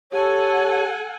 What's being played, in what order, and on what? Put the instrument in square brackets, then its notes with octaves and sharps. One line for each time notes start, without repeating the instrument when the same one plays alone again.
[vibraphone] G4 A5 [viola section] A4 F#5 G#5 [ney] C#5